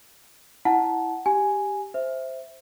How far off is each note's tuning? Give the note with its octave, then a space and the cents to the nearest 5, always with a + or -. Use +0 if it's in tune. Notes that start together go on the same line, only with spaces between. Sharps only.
E4 +0 F#5 +0 A5 -25
G4 +0 G#5 +0
C5 +0 E5 +0